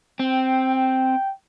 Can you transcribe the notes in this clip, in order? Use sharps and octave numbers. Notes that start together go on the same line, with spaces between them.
C4 G5
G5